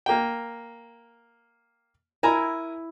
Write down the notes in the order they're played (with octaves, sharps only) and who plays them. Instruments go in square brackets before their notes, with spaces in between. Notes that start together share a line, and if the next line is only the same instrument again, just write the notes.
[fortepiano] A#3 G5
[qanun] E4 [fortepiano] A#4 G#5 A#5